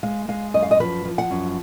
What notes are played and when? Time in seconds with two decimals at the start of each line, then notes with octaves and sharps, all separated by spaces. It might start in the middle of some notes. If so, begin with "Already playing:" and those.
0.03 G#3 F5
0.28 G#3 F5
0.54 F#2 D#5
0.62 F5
0.71 D#5
0.80 F3 B4
1.05 F3
1.18 F#5
1.31 F#2